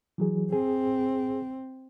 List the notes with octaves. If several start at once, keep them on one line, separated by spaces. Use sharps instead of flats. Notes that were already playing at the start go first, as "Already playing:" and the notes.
E3 F#3 G#4
C4 G#4